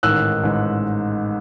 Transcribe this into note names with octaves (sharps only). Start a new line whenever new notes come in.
A1 G#2 D#3 E6 F#6
A1 G#2 D#3